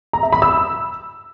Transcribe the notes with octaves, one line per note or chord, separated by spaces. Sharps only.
A#5
E5
B5
E6